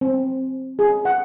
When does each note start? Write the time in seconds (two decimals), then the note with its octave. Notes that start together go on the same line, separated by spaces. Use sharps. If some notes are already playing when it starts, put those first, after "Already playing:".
0.01 C4
0.79 G#4
1.05 F#5